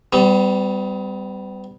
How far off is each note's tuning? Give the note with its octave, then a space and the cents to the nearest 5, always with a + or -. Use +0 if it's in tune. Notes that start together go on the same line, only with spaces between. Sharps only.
G3 +0 B3 +45